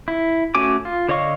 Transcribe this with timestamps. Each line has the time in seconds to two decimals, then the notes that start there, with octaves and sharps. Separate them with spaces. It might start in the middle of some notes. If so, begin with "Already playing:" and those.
0.08 E4
0.55 A3 C#4 F#4 G#5 D6
0.85 F4
1.09 D3 C#5 D#5 F5 C#6